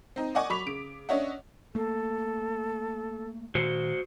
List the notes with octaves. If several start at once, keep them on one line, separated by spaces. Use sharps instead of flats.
C4 D#4
D5 D#5 F#5 G#5 C#6 D6
F#3 B5 C#6 B6 F7
C#3 D7
C#4 D4 C#5 D#5 E5 F#5
A3 A#3 A4
A#2 D#3 F#4 C5